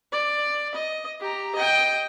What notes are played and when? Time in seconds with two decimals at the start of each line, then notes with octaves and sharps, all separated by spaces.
0.12 D5
0.75 D#5
1.20 G4 A#5
1.55 D#5 G5